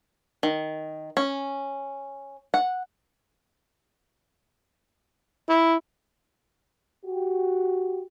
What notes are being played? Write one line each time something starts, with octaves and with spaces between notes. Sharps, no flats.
D#3
C#4
F#5
E4
F#4 G4